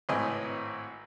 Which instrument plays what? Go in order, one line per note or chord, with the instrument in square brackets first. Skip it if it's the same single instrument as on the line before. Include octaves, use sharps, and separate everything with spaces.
[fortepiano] G#1 A2 C4 B4 D#5 G#5